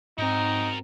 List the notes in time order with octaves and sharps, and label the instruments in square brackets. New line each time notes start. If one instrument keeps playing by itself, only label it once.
[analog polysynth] G#2 C4 [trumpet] D#4 [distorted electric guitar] F#4 A#4